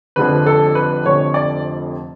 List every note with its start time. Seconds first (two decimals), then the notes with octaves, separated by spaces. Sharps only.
0.16 F1 F2 D3 F3 B4
0.46 A4
0.75 B4
1.06 F1 F2 D3 F3 C#5
1.34 D5